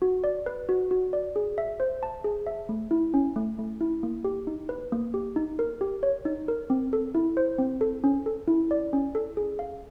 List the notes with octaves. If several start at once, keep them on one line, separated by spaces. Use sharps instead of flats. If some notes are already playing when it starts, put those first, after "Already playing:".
F#4
D5
B4
F#4
F#4
D5
G#4
E5
C5
A5
G#4
E5
A3
E4
C#4
A3
A3
E4
A#3
G4
D#4
B4
A#3
G4
D#4
A#4
G4
C#5
D#4
A#4
C4
A4
E4
C5
C4
A4
C#4
A4
E4
D5
C#4
A4
G#4
F5